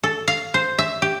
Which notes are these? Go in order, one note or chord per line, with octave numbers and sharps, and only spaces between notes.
A4
F5
C5
E5
G4